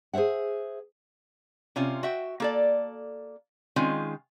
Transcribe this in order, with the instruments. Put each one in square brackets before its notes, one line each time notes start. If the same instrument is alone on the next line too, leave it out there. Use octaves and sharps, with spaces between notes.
[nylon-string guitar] G#4 C5 C#5 E5 F#5
[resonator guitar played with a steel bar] C3 C#4 F4
F#4 E5 G5
A#3 A4 D5
D#3 G#3 C4 C#4 F4